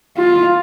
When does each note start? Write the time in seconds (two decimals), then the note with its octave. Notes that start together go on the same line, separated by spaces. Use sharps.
0.18 F4